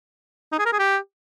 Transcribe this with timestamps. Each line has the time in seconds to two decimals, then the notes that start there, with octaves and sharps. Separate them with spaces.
0.52 D#4
0.59 G#4
0.66 A#4
0.72 G#4
0.79 G4